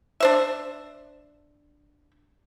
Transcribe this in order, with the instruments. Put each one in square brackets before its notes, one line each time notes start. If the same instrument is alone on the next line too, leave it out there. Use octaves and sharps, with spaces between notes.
[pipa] D4 C5 E5